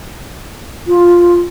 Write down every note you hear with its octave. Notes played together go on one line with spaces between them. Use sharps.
F4